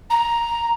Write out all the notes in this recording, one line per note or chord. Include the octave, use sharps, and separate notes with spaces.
A#5